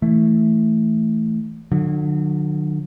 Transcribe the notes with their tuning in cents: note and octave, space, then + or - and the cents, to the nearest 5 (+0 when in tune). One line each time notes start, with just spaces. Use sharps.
E3 -10 A3 +0
D3 +35 F#3 -30